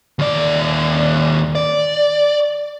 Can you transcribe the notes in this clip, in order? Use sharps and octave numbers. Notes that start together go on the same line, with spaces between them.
D#2 D5
D5